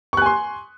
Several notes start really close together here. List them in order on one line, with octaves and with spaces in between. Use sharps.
C#6 F#6 G#5 C6